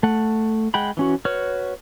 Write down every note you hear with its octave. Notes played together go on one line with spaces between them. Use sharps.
A3 F#5
G#3 F#5 G5 B5
E3 C#4 F#4
F#4 B4 C#5 F6